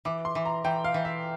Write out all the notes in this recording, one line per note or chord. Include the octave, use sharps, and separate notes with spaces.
E3 D6
C6
E3
A#5
E3 G5
F5
E3
E5